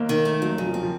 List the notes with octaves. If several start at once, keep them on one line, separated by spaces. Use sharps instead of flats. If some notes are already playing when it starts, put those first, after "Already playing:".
Already playing: D#2 A#3
D#3
A3
F2 F#3
C#3 F#3
F3
C4
F3